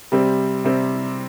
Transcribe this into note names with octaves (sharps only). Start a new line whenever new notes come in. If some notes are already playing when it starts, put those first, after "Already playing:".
C3 G3 C4
C3 G3 C4